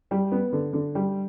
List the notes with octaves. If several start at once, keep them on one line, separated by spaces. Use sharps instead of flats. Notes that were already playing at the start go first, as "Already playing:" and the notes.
G3
B3
D3
D3
G3